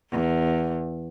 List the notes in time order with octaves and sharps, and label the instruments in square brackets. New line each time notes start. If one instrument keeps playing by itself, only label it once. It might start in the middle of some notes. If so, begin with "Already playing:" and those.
[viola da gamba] E2